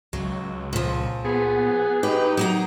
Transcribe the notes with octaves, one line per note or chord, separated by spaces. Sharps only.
C#2 F#3
A#2 F3
B3 G#4
D#4 G4 B4
F#3 A#3 A#5